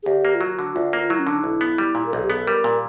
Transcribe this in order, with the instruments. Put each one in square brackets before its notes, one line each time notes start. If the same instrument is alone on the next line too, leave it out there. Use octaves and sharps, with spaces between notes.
[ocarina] G#4
[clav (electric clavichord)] D2 [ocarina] G4
[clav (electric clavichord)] A#3
[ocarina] F4
[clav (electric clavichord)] F#3 [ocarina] F#4
[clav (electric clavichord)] D3
[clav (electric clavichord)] D2 [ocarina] F4
[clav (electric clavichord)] A#3
[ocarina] F4
[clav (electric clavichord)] F#3 [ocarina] E4
[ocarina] C#4
[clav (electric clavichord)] D3 [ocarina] D4
[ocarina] D#4
[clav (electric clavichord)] B1 [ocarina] E4
[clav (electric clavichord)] B3
G3
A#2
[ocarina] A#4
[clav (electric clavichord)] B1 [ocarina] A4
[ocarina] G4
[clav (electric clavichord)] B3 [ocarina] G#4
[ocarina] A4
[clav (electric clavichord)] G3 [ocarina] A#4
[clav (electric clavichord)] A#2